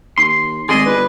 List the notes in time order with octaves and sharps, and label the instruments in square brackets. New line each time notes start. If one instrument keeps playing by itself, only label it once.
[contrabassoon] D#2 [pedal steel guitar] C6
[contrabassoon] G#1 [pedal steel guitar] G#4 D5 D#5 [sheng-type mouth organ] C6
[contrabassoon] G1 [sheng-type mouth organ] B4